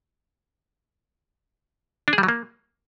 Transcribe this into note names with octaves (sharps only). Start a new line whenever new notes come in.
D4
G#4
G3
F#3
A#3